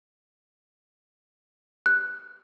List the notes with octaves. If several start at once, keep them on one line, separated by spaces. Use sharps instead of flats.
F#6